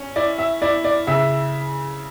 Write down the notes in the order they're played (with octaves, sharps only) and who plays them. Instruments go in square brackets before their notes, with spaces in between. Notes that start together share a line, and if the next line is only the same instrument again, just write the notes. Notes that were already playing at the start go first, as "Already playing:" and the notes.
Already playing: [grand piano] C#4
[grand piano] E4 [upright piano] D5
[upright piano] E5
[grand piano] E4 [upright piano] D5
[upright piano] D5
[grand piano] C#3 [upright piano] E5